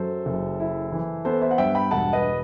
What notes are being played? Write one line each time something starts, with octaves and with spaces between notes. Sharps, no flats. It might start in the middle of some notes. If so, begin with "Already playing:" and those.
Already playing: F#2 F#3 A4 C5
F#1
E4
E3
B3 A4 C5
C5 E5
F#5
G2 E5 G5
G5 B5
E1 F#5 A5
B4 D#5